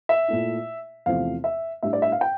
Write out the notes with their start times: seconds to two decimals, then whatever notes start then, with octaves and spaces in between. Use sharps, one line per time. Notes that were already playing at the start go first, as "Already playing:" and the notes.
0.09 E5
0.28 A#2 A3 E4
1.06 E2 C3 F3 A3 F5
1.44 E5
1.83 A2 G3 D4 E5
1.93 D5
2.02 E5
2.12 F5
2.21 G5